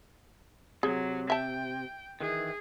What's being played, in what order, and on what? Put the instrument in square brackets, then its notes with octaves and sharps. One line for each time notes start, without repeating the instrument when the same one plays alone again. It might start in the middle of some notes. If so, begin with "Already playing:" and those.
[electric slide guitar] C3 [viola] F#3 [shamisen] G#4
[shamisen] E5 A5 [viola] G5
[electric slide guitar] D#3 E3 [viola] G#4